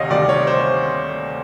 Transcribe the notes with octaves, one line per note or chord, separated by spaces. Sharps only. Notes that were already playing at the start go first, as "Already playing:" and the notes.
Already playing: D2 C3 D#3 C#5 D#5 F5
D2 C3 D#3 G3 D5
C#5
C5